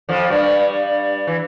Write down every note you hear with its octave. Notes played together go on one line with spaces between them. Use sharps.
F2 F3
G2 G3
E3